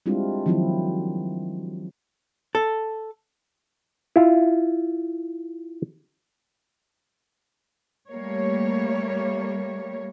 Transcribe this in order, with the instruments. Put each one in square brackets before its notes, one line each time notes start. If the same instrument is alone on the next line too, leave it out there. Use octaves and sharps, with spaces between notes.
[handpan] G3 G#3 C4 D4 E4 F4
D#3 F3 F#3 C4 E4 F4
[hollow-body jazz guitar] A4
[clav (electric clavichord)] E4 F4
[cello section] G3 A3 A#3 C#5